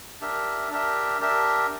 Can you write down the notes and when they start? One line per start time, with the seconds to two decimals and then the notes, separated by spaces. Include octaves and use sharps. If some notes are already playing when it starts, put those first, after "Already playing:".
0.21 D4 G4 A#4 E5
0.71 D4 G4 A#4 E5
1.20 D4 G4 A#4 E5